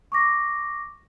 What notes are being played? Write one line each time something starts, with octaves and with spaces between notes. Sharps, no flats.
C#6 D6 A#6